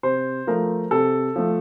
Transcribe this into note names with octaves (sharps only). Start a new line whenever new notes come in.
C3 C5
F3 A3 A#4
C3 A4
F3 A3